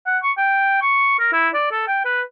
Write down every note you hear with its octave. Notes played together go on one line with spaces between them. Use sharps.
F#5
C#6
G5
C#6
A#4
E4
D5
A4
G5
B4